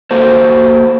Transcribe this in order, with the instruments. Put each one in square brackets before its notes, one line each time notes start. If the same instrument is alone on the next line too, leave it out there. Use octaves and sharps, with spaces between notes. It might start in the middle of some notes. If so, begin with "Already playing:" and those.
[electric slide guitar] A#3 F#4 A4 C5